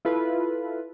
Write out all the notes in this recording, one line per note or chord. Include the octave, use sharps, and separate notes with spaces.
E4 F4 A4 B4